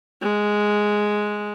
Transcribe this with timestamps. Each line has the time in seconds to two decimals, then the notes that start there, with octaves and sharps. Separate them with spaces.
0.22 G#3